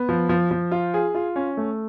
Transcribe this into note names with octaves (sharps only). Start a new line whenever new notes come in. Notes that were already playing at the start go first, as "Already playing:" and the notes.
Already playing: B3
F3
F3
F3
F4
G#4
F4
C#4
A3